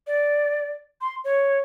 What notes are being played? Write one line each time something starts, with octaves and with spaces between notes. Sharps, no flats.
D5
C6
C#5